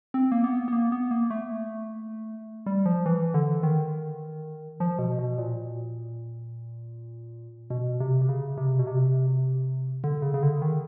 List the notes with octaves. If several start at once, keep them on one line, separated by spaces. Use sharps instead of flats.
C4
A#3
B3
B3
A#3
B3
A#3
A3
G3
F3
E3
D3
D#3
F3
B2
B2
A#2
B2
C3
C3
C#3
C3
B2
C3
D3
C#3
C#3
D3
D#3